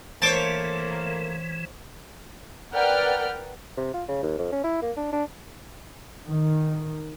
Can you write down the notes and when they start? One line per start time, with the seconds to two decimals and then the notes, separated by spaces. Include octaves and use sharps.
0.22 A2 E3 A3 A#3 C5 C#5 A5 D6
2.73 A#4 B4 D5 F#5 G5 F6
3.77 C3
3.94 F4
4.08 C#3
4.23 D#2
4.39 F2
4.52 C#4
4.64 E4
4.82 A#3
4.97 D4
5.12 D4
6.28 D#3